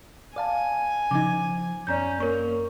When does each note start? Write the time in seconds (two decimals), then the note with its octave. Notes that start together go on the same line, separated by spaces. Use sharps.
0.36 D5 F5 G#5 A5
1.11 C#3 F3 D#4 D6 G#6
1.87 F#2 C#4 D5 A#5 G6
2.20 A#3 A#4 C#5 C#6